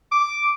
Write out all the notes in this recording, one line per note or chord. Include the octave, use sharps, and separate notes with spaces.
D6